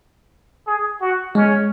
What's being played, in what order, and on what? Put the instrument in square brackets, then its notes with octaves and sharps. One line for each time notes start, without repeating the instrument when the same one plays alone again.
[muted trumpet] G#4
F#4
[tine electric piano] G#3 [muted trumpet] C#4